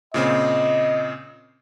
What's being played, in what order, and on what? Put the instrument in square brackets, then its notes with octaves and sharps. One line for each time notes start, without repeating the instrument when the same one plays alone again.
[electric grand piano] A#2 C#3 C4 [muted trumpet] D#5